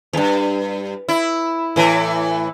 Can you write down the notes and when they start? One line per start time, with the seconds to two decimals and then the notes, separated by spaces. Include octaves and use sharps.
0.13 E2 G2
1.09 E4
1.76 A2 E3